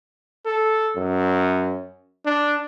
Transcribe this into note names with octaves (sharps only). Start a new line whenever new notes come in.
A4
F#2
D4